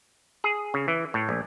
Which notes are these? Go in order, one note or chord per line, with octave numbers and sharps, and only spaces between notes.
G#4
C#3
E3
A2
A#1